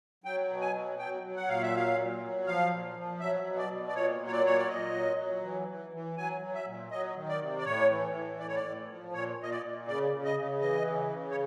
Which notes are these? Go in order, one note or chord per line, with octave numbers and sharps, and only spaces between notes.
F#3 G5
B2
G#5
F#3
F#3 G5
F#3
F#5
A#2 F5
E5
F#3 F5
A#2
F#3
F3 F5
A#2
F3
F#3 E5
B2
D5
B2
D5
A#2 C#5
F#3
C#5
D5
A#2 C#5
D5
A#2 D#5
F#3
F#3
E3
E3
E3
F#3 G#5
F#3
E5
A#2
F#3 D#5
D#3
D5
C3
D5
A2 C#5
E3
A2
A2 D5
C#5
D5
A2
F3
A#2 C#5
A#2 D#5
D5
A#2
C#3 D5
C#3
D#5
C#3
E3 D#5
C#3
C#3
C#5